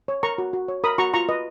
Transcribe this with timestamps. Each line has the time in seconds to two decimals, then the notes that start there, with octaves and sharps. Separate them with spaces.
0.08 C#5
0.23 A#4 A#5 C#6
0.38 F#4
0.53 F#4
0.68 C#5
0.84 A#4 B5 D#6
0.98 F#4 A#5 C#6
1.14 F4 A#5 C#6
1.29 B4 D#5